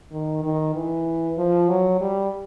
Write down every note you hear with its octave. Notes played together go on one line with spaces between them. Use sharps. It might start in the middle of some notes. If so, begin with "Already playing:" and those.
D#3
D#3
E3
F3
F#3
G3